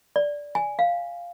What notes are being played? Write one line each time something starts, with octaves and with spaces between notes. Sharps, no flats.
D5
G#5
F5